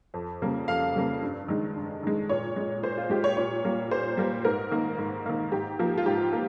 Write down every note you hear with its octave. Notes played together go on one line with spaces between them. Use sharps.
F2
C#3 G3 A#3
F2 F5
C#3 G3 A#3
G2
D#3 G#3
G2
D#3 G#3
A#2 C#5
G#3
A#2 C5
F4
G#3 G4
C#5
A#2 C#5
G3 A#3
A#2 C5
G3 A#3
G#2 A#4
D#3 A#3
G#2
D#3 A#3
G#2 G4
F3 A#3
F4
G#2 G4
A#3